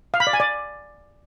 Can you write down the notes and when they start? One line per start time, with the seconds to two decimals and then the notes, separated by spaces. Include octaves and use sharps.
0.14 F5
0.20 B5
0.27 D5
0.33 G#5
0.40 D5